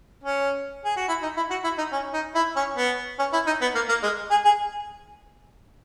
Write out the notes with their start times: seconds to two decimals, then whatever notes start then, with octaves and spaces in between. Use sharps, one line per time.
0.23 C#4
0.85 G#4
0.97 F#4
1.08 E4
1.22 D#4
1.36 E4
1.50 F#4
1.64 E4
1.78 D#4
1.92 C#4
2.13 D#4
2.35 E4
2.56 C#4
2.77 B3
3.19 C#4
3.33 E4
3.47 D#4
3.61 B3
3.75 A#3
3.89 A#3
4.03 G#3
4.31 G#4
4.45 G#4